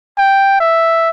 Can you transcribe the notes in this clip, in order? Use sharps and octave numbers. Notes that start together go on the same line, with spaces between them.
G5
E5